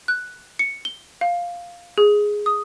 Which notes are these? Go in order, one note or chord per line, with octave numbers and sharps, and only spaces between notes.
F#6
C#7
G7
F5
G#4
D#6